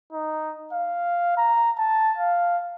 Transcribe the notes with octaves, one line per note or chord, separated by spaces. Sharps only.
D#4
F5
A#5
A5
F5